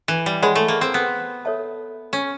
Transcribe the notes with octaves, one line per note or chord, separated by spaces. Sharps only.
E3
G3
G#3 G#4 C#5 F#5 B5
A3
A#3
C4
B3
A4 C#5 E5 A5
C#4